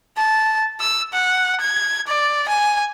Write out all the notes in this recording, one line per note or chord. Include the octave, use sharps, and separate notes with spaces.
A5
E6
F#5
G#6
D5
G#5